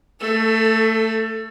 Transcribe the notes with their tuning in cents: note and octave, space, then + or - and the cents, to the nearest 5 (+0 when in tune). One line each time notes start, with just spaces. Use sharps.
A3 +20 A4 +0